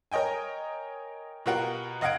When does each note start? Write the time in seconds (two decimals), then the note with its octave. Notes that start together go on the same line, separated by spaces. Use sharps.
0.12 A#4 C#5 D#5 G5 G#5
1.46 B2 F4 G4 A#4 F#5
2.01 F1 D#5 F5 F#5 G#6 D7